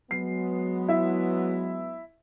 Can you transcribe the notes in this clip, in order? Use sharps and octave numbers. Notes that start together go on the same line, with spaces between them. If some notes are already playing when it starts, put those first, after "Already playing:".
F#3 G#3 B3 C7
E4 E5